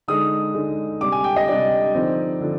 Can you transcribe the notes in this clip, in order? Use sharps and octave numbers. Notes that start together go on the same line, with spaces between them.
D3 G#3 D#4 D#6
D3 G#3 D#4
C3 G3 D4 D6
G#5
G5
D#5
C3 G3 D4 D5
D3 F3 C4 D#4
D3 F3